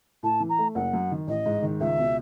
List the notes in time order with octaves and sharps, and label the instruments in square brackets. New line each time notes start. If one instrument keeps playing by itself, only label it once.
[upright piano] A2 [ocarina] A5
[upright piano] E3
[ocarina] A#5
[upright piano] A3
[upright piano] F#1 [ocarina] F#5
[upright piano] F#2
D#3
[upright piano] A1 [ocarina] D#5
[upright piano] G#2
D#3
[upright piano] C#2 [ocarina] E5
[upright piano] B2